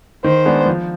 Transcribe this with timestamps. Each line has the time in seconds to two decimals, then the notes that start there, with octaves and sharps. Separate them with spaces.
0.24 D#3 C5
0.46 G#3 B3 D4
0.66 F3